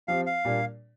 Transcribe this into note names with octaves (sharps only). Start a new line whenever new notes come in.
F3 C4 G4 F5
F5
A#2 G3 A#3 D4